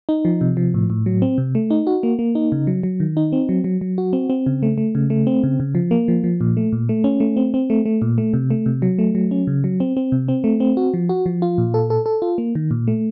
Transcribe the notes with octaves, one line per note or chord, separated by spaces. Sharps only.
D#4
F3
C3
F3
A2
A2
F#3
C4
C3
A3
D#4
F#4
A#3
A#3
D#4
C#3
F#3
F#3
D#3
D#4
C4
F#3
F#3
F#3
F#4
C4
C4
C#3
A3
A3
C#3
A3
C4
C#3
C#3
F3
A#3
F3
F3
A#2
A3
A#2
A3
C#4
A3
C4
C4
A3
A3
A#2
A3
C3
A3
C3
F#3
A3
F#3
C#4
C#3
F#3
C4
C4
C3
C4
A3
C4
F#4
F3
F#4
F3
F4
A#2
A4
A4
A4
F4
A#3
D#3
A#2
A3